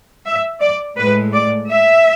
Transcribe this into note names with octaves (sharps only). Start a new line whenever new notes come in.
E5
D5
A2 G#3 B4
D5
E5